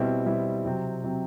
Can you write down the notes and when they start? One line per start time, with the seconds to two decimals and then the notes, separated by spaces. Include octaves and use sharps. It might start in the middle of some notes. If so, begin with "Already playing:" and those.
Already playing: B2 G3 C4 E4
0.26 B2 G3 C4 E4
0.65 C3 F#3 C4
1.03 C3 F#3 C4